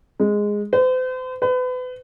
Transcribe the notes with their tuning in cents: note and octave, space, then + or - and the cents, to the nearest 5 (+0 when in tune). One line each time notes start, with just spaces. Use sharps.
G#3 -5
C5 -40
B4 +35